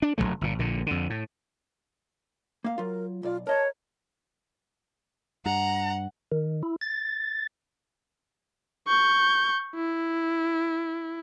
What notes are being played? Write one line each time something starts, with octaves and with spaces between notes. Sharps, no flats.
D4
F1 F#2 F#3 A3
G1 A#2
A#1 A#2 D3
F2 D3
A2
A#3 F5
F#3 F4 A#4
B1 F4 D5
A#4 C#5 D#5 A5 A#5
G2 F#5 A#5
D#3
E4
A6
C#6 G6
E4